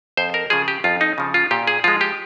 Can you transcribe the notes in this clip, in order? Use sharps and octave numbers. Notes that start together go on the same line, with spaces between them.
F2 C5
A#4
C#3 F3 G#4
G4
F2 F4
D#4
C#3 F3
F4
A#2 G4
G#4
F3 G#3 F4
G4